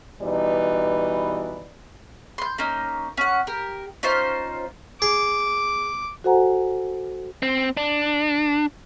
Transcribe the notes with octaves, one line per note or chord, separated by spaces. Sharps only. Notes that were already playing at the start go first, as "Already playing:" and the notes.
B2 E3 G3 D#4 B4 D5
C6 G6
A#3 C#4 D#4
C#4 F#5
G4 A#4
C#4 D#4 F4 C5
G#4 D6
F#4 A4 C5 F#5 G#5 A#5
C4
D4